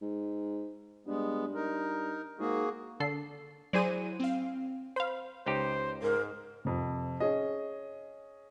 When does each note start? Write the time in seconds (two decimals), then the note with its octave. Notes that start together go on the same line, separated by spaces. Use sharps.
0.01 G#2
1.07 G2 G#3 B3
1.54 D#4 A#4
2.39 G#2 A#3 F#4 G#4
3.00 D3 A4 C7
3.73 F#3 E4 G#4 C5 D5 D#7
4.20 C4 F5
4.96 C5 F5 B5
5.46 C#2 D#4 G4 C5
6.02 G#2 A#4
6.65 F2 C3
7.20 C#4 G#4 D#5